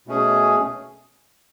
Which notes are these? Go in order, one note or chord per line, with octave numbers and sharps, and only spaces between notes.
B2 A3 C#4 G#4